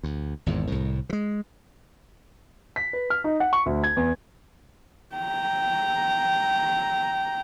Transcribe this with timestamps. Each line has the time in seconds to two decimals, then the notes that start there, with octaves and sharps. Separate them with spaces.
0.03 D2
0.46 G#1 E2 G#2
0.68 C2 A2
1.09 E3 G#3
2.76 B6
2.93 B4
3.10 F6
3.24 D#4
3.40 F#5
3.53 C#6
3.66 D2
3.84 G#6
3.97 E2
5.16 G5 A#5